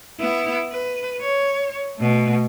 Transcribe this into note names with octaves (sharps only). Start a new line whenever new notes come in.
B3 E4
B4
C#5
B2 A3